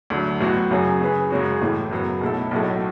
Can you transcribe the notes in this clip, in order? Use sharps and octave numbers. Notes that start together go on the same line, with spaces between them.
D2 D3 F#3
A1 A2 F#3 B3 F#4
F#2 C#3 F#3 C#4 G#4
C#3 F#3 C#4 G#4 B4
F#2 C#3 G#3 C#4 F#4
A1 A2 E3 A3
F#2 C#3 F#3 B3
B1 B2 A3 E4 A4
B1 A2 F#3 A3